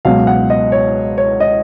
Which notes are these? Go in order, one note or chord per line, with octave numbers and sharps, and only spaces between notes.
C#2 B2 F#3 F5
F#5
D#5
C#5
C#5
D#5